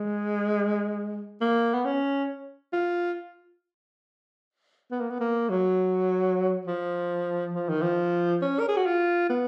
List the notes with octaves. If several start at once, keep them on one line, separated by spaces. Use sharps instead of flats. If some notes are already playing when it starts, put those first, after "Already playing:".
Already playing: G#3
A#3
B3
C#4
F4
B3
A#3
B3
A#3
F#3
F3
F3
D#3
F3
C#4
A#4
G#4
F#4
F4
B3